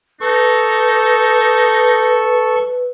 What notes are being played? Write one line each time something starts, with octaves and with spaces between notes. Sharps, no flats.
D#4 A4 B4 C#6